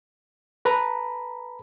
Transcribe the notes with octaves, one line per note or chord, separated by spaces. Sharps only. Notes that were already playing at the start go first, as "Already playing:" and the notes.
A4 B4 A#5 B5